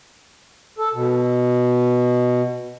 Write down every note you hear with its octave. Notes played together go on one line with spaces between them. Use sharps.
A4
B2